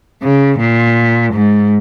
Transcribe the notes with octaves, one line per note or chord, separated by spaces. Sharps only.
C#3
A#2
G#2